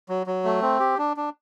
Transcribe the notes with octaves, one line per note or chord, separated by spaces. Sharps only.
F#3
F#3
A3
C4
G4
D4
D4